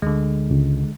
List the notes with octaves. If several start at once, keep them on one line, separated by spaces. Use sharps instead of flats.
D2 D3 G#3
C#2